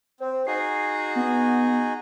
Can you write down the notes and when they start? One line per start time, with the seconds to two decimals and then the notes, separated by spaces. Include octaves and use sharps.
0.20 C4 C5
0.47 D#4 F#4 G#4 C7
1.16 B3